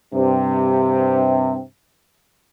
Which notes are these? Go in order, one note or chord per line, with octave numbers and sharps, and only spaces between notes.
G2 C3